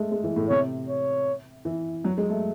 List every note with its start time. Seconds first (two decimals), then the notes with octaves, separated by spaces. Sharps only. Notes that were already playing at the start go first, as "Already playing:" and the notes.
Already playing: G#3 A3
0.12 G#3
0.24 E3
0.36 A2
0.49 C3 C#5
0.88 C#5
1.65 E3
2.04 F#3
2.18 G#3
2.29 A3